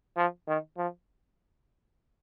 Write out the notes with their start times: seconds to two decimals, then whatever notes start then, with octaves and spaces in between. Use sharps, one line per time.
0.17 F3
0.48 D#3
0.78 F3